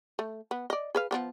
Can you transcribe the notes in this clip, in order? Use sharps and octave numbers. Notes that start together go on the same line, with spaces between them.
A3
B3
D5 D#5
G#4 B4 F5
F3 B3 G4